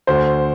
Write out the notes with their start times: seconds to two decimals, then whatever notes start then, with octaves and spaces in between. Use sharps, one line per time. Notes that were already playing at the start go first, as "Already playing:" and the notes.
0.07 D2 C5